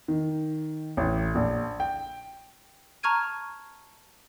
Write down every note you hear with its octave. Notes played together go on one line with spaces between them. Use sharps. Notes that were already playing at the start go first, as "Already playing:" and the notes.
D#3
A1
A#1
G5
A5 A#5 C#6 F6 G#6 D#7